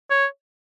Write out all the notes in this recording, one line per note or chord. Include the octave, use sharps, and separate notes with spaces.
C#5